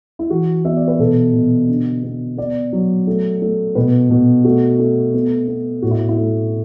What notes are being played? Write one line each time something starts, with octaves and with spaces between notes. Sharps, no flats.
E4
E3 F#4
B3 E5
D5
B4
B2 A4
B2
D3
B3
B3 D5
F#3
A3
A3
B2 B4
B2
A3 F#4
A3
B3
B3
A2 F#4
E4
E4
A3